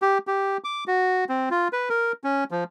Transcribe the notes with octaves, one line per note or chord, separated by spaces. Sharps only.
G4
G4
D6
F#4
C4
F4
B4
A#4
C#4
F3